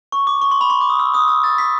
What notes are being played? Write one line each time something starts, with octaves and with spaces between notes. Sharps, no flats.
C#6
D6
C#6
C6
B5
C6
D6
D#6
E6
D#6
E6
A6
B6